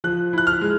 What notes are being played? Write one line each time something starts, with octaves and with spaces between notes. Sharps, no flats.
F3 F#6
E4 F#6
F6
G#3